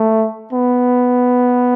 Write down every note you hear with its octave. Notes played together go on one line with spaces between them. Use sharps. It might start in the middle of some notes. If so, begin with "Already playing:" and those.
Already playing: A3
B3